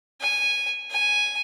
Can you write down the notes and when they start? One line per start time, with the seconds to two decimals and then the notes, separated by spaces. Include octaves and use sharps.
0.21 G#5
0.91 G#5